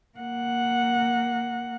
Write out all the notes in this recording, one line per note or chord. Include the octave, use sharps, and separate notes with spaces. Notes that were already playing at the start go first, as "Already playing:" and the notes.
A#3 F#5